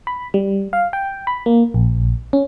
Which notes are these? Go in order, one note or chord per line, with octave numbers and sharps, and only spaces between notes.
B5
G3
F5
G5
B5
A#3
A#1
C#4